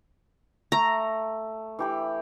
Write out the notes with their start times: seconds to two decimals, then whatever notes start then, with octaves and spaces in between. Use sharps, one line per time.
0.72 A3 A#5
1.79 E3 G4 B5